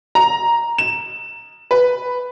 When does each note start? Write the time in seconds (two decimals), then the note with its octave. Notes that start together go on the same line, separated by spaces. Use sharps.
0.15 A#5
0.78 E7
1.71 B4